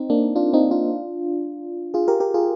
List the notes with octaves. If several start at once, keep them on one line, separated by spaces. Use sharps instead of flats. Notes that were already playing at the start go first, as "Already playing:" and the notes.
Already playing: C4 D#4
A#3 D4
D4 F4
C4 D#4
D4 F4
F4 G#4
G4 A#4
G4 A#4
F4 G#4